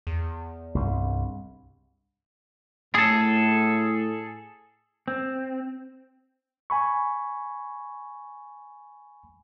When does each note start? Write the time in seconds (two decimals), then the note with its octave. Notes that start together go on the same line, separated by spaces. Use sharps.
0.07 E2
0.75 C2 G2
2.95 A2 G#4 A4
5.08 C4
6.70 G#5 B5 C#6